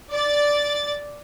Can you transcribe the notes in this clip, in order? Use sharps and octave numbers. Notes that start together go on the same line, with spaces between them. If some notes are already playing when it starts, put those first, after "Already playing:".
D5 A6